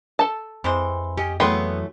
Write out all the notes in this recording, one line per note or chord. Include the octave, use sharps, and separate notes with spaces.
A4 A5
F2 E3 G#3 C4 C5
C#4 G4 D#5
E3 F#3 A3 B3 G#4 B4 G5 C6